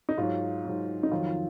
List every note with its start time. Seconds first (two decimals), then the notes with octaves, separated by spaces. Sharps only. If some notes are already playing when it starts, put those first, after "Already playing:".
0.09 D#4
0.17 G#2 F#3 F4
0.64 G#2 F#3
1.03 D#4
1.11 F2 D#3 F#3 F4
1.27 F4